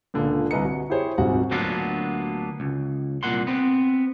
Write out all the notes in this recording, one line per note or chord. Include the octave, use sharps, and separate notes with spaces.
C#2 A#2 D3
C2 B4 D#5 A#5 C#7
F#4
E4 G4 G#4 C5 C#5
D#1 G#2 C3 F#4 F#5
D2 F#3 A#3 B3 D4 F4
C#2
C2 A#2 F#5 C6
B3 C4